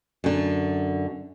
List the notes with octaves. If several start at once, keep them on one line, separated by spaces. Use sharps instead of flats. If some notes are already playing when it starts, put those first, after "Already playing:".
F#2 D3